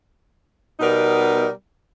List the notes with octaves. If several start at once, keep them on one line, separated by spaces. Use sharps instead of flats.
B2 G3 B3 D#4 A#4